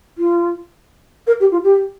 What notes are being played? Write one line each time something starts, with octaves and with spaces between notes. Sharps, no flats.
F4
A#4
G4
F4
G4